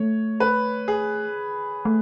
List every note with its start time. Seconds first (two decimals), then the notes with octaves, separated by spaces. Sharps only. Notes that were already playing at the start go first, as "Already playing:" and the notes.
Already playing: A3 C#5
0.40 B4
0.88 G#4
1.85 A3